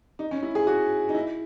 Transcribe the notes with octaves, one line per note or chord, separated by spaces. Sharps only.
D#4
C#4
E4
G#4
F#4
D#4
E4